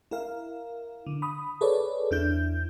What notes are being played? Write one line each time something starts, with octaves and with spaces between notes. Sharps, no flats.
E4 A#4 F5
D3
B5 D#6
G#4 A4 B4 C#5 D5
E2 D4 E4 G6